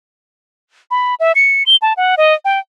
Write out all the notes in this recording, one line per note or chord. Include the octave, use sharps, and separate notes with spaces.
B5
E5
C#7
G7
A5
F#5
D#5
G5